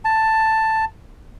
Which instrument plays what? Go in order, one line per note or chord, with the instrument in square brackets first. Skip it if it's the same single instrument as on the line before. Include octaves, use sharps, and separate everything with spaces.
[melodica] A5